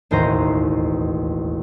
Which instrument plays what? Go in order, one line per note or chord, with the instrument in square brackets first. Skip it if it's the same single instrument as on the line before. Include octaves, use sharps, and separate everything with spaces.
[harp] E1 A1 D#2 C5 D#5 A#5